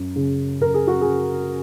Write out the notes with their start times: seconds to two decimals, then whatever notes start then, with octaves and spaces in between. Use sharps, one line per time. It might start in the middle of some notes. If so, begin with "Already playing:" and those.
Already playing: F#2
0.16 C#3
0.61 F#2 A#4
0.74 G#4
0.88 F#4
1.01 G#4
1.07 C#3